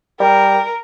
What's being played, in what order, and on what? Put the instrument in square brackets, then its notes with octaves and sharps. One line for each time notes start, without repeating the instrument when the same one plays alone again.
[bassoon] G3 [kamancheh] A#4